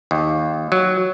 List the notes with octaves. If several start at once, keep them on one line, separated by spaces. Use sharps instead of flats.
D#2
F#3